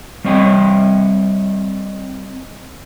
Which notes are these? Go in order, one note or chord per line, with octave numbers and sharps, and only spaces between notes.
G3 C4 C#5 D#5 G5